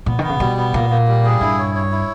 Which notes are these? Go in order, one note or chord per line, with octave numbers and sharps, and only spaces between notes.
A#2 B3
D#3 B3
C#3
B2 G3
B3
A#2 A#3
A#3
G3
G#4
G2 E4
C#5
C#5
E4